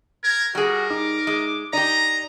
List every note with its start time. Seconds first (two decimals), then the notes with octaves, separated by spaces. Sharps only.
0.24 A#4 G#6
0.55 G3 F#4 G#4 A#4
0.91 D#4 D6
1.27 G#3
1.73 D#4 G4 D5 A#5